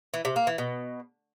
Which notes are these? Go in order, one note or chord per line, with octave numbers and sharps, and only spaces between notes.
E3
C3
A#3
E3
B2